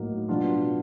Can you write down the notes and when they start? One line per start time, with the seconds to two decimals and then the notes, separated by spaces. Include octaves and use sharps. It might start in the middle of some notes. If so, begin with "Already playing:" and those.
Already playing: A2 F#3 A#3 D#4
0.29 B2 F#3 B3 D4 F4